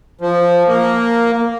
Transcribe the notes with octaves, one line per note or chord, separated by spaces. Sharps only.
F3
A#3